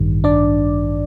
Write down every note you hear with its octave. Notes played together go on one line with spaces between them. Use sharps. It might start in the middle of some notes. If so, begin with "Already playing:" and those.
Already playing: A1 G2 D#3 G3
D4 D5